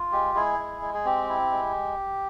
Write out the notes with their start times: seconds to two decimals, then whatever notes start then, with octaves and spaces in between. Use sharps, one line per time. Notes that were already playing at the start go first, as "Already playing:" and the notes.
Already playing: F4
0.12 G#3 G4
0.35 G#3 E4 G#4
0.59 G#3
0.82 G#3
0.94 G#4
1.05 C4 G4
1.29 E4
1.51 G#3